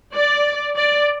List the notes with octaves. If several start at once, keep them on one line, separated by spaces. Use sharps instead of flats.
D5
D5